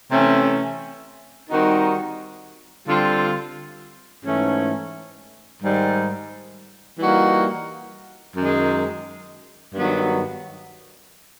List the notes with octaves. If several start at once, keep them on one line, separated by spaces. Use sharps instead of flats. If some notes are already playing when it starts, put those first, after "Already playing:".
C3 E3 A3 C#4
D#3 G3 C4 D#4 F#4
D3 G3 C4 F4
G#2 E3 A3 C#4
G#2 D#3 G3
E3 G3 A#3 D#4 F#4
F#2 D#3 G#3
G2 D#3 F#3 B3